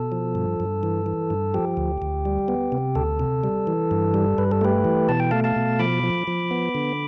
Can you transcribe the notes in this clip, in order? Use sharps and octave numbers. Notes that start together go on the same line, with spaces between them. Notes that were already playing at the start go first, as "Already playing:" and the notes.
Already playing: B2 A4
F3
G2
G2
E3
E3
G2
F3 G4
D2
D2
G3
B3
C3
D2 A4
C3
G3
E3
G2
G3
G2 B4
A4
A3 G4 B4
E3
B2 A5
G5
A3 F5 A5
F5 A5
B2
F3 B5 D6
F3
F3
B3
D3